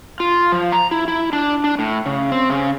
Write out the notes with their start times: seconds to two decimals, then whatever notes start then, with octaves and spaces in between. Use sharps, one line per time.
0.20 F4
0.52 F3
0.72 A#5
0.91 E4
1.08 E4
1.33 D4
1.64 D4
1.79 A2
2.06 C#3
2.32 C4
2.50 C#3